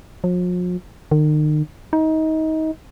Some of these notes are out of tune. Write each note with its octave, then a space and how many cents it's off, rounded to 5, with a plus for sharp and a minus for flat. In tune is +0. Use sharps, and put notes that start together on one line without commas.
F3 +45
D#3 -40
D#4 +25